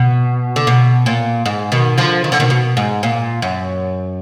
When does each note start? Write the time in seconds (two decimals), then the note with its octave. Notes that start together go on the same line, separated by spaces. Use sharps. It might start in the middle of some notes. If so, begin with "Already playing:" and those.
Already playing: B2
0.56 D3
0.67 B2
1.06 A#2
1.46 G#2
1.72 B2 D#3
1.98 D3 F3
2.24 D#3
2.32 D3
2.40 B2 D#3
2.50 B2
2.77 G#2
3.03 A#2
3.42 F#2